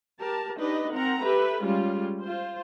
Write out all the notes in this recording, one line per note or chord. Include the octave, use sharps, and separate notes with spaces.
G4 A#4 A5
D4 D#4 G4 B4 D#5
C4 A#4 F#5 A#5
G4 A4 B4 E5
G3 G#3 C#4 F4
F4 C5